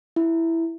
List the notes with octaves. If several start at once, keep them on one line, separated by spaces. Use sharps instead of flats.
E4